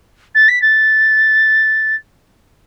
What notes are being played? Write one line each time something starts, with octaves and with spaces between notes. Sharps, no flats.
A6
B6
A6